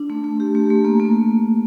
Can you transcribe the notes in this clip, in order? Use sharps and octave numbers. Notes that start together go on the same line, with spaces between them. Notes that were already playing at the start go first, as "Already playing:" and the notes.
Already playing: D4
A3
A3
G4
A3
A3
A#3
A#3